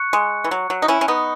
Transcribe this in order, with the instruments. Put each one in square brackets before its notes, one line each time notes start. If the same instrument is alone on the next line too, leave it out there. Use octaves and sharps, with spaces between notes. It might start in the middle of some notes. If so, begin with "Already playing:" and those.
Already playing: [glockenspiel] C#6 F#6 C#7
[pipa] G#3
E3
F#3
F#3
D#4
C#4 E4
C#4
B3 D#4